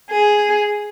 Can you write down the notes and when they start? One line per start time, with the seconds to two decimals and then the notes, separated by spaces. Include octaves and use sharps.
0.11 G#4